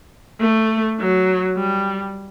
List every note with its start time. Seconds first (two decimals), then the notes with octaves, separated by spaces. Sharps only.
0.41 A3
1.00 F#3
1.57 G3